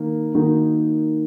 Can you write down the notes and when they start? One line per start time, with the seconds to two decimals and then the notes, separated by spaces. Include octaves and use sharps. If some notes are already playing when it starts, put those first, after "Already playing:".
Already playing: D#3 A#3
0.35 D#3 A#3 D#4 F#4